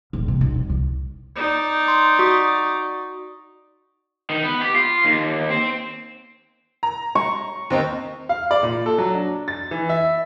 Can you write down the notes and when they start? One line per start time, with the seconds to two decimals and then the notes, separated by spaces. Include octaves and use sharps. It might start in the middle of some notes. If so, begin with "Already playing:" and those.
0.13 D#1
0.28 C3
0.41 B1
0.56 F2
0.70 C2
1.36 D#4 D5
1.88 C6
2.19 F#4 C#6 D#6
4.30 D#3
4.44 B3
4.62 G4
4.75 F4
5.05 D#2
5.50 C4
6.83 A#5
7.15 C#6
7.70 D#2 C4 D#4
8.29 F5
8.51 D5
8.63 A#2
8.86 A4
8.98 F#3
9.15 D4
9.48 A6
9.71 E3
9.89 E5